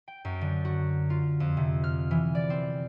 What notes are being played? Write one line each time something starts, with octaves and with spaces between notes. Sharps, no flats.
G5
F#2
D3
F#4
F4
F2
C3
F6
E3
D5
C4